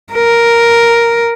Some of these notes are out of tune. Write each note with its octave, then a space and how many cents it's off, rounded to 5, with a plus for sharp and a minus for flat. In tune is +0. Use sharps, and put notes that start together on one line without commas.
A#4 +0